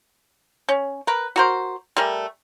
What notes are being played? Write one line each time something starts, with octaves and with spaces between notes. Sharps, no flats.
C#4
A#4 B4
F#4 A#4 C5
G3 A3 A#4 G#5